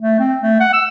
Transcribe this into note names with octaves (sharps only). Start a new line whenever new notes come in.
A3
C4
A3
F#5
E6